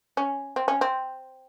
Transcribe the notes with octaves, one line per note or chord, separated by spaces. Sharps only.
C#4
C4
C#4
C4